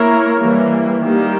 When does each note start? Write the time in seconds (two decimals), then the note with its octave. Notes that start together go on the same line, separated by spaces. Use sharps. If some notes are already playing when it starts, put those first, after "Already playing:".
Already playing: A#3 E4 A#4 C#5
0.40 E3 G3 A#3
1.01 D#3 G3 A#3